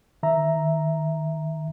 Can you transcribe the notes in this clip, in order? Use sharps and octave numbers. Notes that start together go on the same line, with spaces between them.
D#3 E5 A#5